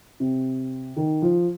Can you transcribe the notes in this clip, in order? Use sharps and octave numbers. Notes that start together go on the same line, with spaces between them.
C3
D#3
F3